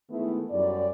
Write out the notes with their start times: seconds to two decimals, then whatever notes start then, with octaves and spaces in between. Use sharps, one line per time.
0.10 D#3 G#3 A3 B3 E4
0.51 F#2 G3 D5